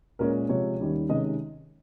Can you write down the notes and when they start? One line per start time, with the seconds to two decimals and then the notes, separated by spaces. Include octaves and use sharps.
0.19 A#2 G#3 C#4 A#4
0.49 C3 F3 G#3 C#5
0.79 D#2 D#3 G3 C#4
1.09 C3 D#3 G#3 C#4 D#5